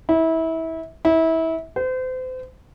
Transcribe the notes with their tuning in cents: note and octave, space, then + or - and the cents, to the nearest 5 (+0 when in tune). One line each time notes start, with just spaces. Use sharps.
E4 -25
E4 -25
C5 -35